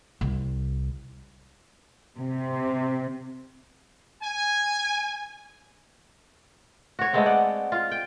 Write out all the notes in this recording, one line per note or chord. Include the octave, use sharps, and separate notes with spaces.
C2
C3
G#5
F#4 C#5
G#3 A3 B3 C4
D5 F#5
F4
G5